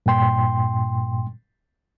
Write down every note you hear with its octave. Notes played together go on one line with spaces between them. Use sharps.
G2 A#2 G5 C6